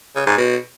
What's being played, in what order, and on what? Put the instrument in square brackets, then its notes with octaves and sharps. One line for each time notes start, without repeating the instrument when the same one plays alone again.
[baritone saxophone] C#3
G#2
B2